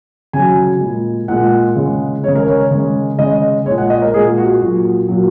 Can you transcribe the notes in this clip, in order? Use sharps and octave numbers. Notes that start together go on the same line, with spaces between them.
C#3 F#3 G#5
A#2 G#3
A#2 G#3 F#5
C#3 G#3
C#3 G#3 C#5
A#4
C#5
C#3 G#3
C#3 G#3 D#5
A#2 G#3 C#5
F#5
D#5
A#4
A#2 G#3 G#4
F#4
A#2 F#3
A#2 F#3